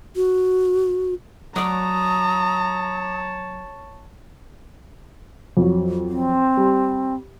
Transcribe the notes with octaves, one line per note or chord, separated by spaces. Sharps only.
F#4
F#3 C#5 D5 A5 A#5 D#6
F2 F#3
C4
G3